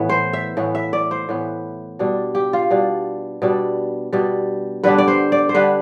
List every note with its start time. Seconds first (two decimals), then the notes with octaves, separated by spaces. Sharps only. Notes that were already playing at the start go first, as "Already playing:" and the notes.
Already playing: A2 E3 B3
0.09 C5
0.33 E5
0.57 A2 E3 B3
0.75 E5
0.93 D5
1.11 C5
1.29 A2 E3 B3
1.99 B2 G3 D4
2.35 G4
2.53 F4
2.70 B2 G3 D4
3.42 B2 G3 D4
4.13 B2 G3 D4
4.84 D3 G3 B3 D4 B4
4.98 D5
5.08 C5
5.32 D5
5.49 C5
5.55 D3 G3 B3 D4 B4